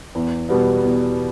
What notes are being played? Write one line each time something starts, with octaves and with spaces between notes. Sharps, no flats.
E2
B2 G3 B3
E2